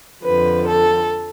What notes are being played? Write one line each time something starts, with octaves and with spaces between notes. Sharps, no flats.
F2 D3 F3 B4
A4